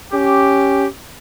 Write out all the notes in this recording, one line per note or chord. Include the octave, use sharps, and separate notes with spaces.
C#4 G4